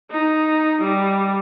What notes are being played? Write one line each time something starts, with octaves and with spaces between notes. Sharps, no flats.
D#4
G3